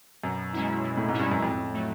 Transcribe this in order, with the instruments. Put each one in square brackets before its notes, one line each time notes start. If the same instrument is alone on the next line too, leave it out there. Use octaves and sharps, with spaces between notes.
[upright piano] F#2 [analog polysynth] B2
[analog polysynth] G#3 C#4 E4
B2
[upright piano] A2
G#2
[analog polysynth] G#3 C#4 E4
[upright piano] G2
F#2
[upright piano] F2 [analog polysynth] A2
[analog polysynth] F#3 A3